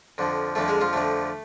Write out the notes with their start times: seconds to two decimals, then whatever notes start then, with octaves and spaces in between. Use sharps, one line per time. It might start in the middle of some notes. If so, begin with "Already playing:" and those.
0.18 F2 D3 F3
0.55 F2 D3 F3 A3 A4
0.68 G#3 G#4
0.81 F3 F4
0.93 F2 D3 F3 A3